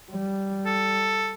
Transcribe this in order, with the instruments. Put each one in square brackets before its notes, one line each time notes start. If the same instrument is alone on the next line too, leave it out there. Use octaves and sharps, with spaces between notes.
[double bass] G3
[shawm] A4